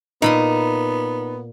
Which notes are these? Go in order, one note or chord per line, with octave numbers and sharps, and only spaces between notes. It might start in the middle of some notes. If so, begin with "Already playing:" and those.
A#2 B3 D#4 B5 C6